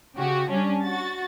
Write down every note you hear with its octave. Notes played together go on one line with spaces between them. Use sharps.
C#3 F#4 G4
G3 C#4 D4
F#4 A6